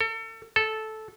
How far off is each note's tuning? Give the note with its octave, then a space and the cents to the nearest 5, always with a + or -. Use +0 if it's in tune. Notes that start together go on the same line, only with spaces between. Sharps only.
A4 +35
A4 -10